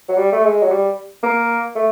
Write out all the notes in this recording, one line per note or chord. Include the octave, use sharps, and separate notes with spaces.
F#3
G3
A3
G#3
F#3
G3
A#3
A3